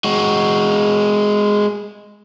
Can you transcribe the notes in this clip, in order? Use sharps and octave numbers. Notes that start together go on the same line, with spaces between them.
G#3 F#4